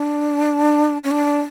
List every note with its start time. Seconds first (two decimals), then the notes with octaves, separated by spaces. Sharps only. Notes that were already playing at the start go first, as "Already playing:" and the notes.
Already playing: D4
1.04 C#4
1.11 D4